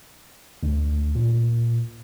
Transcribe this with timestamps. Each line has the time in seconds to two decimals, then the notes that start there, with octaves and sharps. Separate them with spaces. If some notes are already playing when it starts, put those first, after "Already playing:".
0.63 D2
1.15 A#2